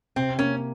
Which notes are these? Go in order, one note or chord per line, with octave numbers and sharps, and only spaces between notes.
C3 C4
A#3 C#4